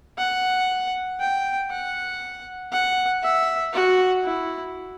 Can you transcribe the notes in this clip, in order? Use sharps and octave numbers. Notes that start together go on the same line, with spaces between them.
F#5
G5
F#5
F#5
E5
F#4
E4